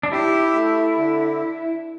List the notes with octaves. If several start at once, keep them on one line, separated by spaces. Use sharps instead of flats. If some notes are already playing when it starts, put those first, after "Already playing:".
D4
E4 G4
A3
D3